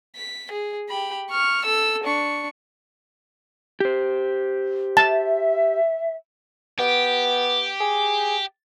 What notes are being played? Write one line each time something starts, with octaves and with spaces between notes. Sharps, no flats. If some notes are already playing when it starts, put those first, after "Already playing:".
B6
G#4
G4 B5
C#6 F6
A4 E6
D4 C#6
G4 C5
E5 A5
B3 G4
G#4